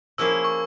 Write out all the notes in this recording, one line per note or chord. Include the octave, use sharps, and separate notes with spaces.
F3 A#3 C#4 E4 G#4 E6
C#6